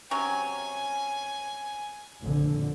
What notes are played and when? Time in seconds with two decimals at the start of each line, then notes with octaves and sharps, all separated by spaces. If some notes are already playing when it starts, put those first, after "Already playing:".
0.11 C3 F#3 C#4 G#5
2.20 F1 A#1 D3